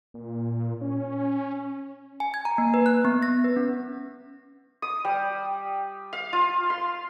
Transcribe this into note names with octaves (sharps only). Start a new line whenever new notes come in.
A#2
C#4
G#5
G#6
A#5
A#3
B4
F#6
B3
A#6
B4
C#4
D#6
G3
F5
F4
C6